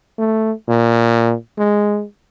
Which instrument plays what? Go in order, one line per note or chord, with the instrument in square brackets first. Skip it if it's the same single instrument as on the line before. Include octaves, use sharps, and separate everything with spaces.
[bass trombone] A3
A#2
G#3